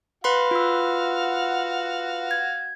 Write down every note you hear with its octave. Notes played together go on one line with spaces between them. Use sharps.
F#4 B4 F5 F#5 B5 C6
F4 E6
G#6